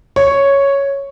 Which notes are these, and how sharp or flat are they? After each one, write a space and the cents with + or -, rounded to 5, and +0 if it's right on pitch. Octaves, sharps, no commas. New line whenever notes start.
C#5 +0